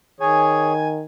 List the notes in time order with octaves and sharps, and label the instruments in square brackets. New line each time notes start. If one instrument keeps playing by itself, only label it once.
[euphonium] D#3 [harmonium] G#4 C#5 [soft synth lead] G#5